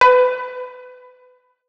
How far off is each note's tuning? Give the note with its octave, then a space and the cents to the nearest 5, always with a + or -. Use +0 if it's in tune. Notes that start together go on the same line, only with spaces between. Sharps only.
B4 +30